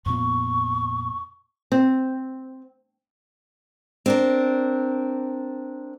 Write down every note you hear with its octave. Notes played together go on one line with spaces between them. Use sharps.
F2 A#2 B3 C#6
C4
C4 D4 A#4